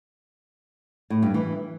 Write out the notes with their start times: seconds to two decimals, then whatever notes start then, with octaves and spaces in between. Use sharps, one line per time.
1.10 A2
1.22 G2
1.34 E3